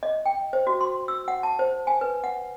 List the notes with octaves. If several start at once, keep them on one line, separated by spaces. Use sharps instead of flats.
D#5
G5
C5
F#4
C6
E6
F#5
A5
C5
G#5
B4
F#5